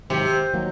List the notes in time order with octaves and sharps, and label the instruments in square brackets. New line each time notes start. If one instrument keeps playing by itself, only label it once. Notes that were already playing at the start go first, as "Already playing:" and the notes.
[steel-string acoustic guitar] G#2 D#3 F#3 [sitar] C3
[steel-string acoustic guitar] D#3 F#3 A#3